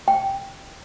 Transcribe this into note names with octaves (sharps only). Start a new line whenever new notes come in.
G5